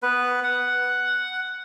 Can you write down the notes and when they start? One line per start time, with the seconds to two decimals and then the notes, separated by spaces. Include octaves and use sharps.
0.03 B3 B4
0.43 F#5